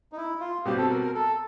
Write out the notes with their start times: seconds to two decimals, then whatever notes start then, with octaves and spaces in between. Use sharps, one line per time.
0.12 D#4
0.17 E4
0.40 F4
0.65 B2 G3 C4 G4
0.78 A4
0.90 A#4
1.02 A#4
1.15 A4